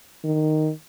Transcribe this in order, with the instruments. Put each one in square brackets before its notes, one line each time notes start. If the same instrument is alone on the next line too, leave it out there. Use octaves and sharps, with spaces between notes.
[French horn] D#3